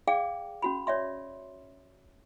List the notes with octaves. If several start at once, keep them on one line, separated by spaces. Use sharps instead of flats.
G#4 D5 F5 G5 D6
C#4 F#4 B5
C#5 D5 E5 C6